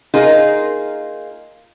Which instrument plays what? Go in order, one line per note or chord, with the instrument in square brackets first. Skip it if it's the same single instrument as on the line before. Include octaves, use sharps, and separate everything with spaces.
[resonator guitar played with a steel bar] A#3 D#4 F4 G#4 A#4